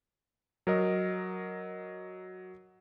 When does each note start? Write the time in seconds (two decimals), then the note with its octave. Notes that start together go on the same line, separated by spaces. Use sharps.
0.67 F#3 A#4 D#5